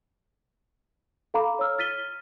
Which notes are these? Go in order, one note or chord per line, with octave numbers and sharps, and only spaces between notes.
A4 F5 A#5 B5 D6
C#5 E6 F6
F6 A6 B6 D#7 G7